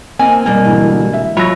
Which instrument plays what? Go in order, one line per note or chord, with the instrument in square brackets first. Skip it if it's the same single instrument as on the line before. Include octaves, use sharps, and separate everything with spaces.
[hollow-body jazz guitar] A#3 C4 D#4 [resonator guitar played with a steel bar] G#5
[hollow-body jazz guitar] B2 G3 A#3
[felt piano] E1 D3 E4
E5
[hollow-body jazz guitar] F#3 F4 C#5 [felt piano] B5 E6 A#6